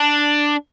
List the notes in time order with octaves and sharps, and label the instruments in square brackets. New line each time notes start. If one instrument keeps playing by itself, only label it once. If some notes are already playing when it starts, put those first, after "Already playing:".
Already playing: [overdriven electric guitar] D4